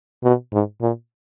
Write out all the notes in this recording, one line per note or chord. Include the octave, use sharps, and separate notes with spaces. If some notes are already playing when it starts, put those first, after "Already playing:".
B2
G#2
A#2